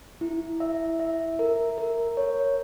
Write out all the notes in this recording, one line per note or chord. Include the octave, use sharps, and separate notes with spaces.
E4
E5
E5
A#4
A#4
C#5